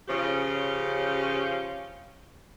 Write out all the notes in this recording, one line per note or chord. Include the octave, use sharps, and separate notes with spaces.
C#3 F3 C#4 F4 G4